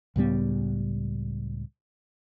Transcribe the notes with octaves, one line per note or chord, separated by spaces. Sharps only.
C#2 A2 G3 B3